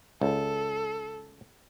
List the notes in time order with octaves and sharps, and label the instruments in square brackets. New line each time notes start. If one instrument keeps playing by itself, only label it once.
[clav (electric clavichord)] C#2 [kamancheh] A4